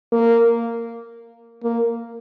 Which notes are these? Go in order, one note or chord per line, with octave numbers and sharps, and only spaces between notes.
A#3
A#3